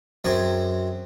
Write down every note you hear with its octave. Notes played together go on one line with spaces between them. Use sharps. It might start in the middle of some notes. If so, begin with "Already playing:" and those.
F#2 C4 G#4